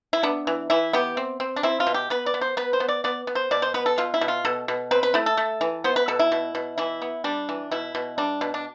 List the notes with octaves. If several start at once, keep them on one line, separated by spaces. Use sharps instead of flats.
E4
B3 D4
E3
E3 E4
B3 G4
C4
C4
D4
C4 E4
F4
B2
G4
B3 B4
D5
B3
C5
B3 B4
C5
B3
D5
B3 D5
B3
C5
B2 D5
C5
B3 B4
A4
B2 F4
E4
B2
F4
B2 A4
B2
C4 B4
B4
A3 E4
A4
A3
E3
B3 C5
B4
B2 A4
E4
B2
B2
E3 E4
B3
G3 D4
E3
B2 E4
B2
G3 D4
B2
D4